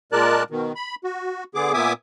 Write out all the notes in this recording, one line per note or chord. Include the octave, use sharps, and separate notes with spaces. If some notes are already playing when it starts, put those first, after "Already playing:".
A#2 G#3 A#4 D5 A5 F#6
B2 D#3
B5
F#4
D3 B3 G#4 D6
A#2 B3 E5 G#5 D6 D#6